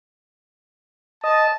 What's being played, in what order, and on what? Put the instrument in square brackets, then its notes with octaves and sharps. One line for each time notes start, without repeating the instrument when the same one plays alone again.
[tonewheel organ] D#5 [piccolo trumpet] A5